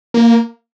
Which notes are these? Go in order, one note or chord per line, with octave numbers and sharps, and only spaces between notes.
A#3